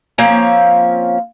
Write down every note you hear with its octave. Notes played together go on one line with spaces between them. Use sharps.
F3 A#3 C4 C#4